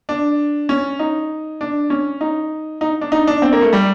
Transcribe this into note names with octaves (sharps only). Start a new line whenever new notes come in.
D4
C#4
D#4
D4
C#4
D#4
D#4
D4
D#4
D4
C4
A#3
A3
G3